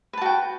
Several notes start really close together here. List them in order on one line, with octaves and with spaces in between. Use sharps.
B4 A5 F#4 G5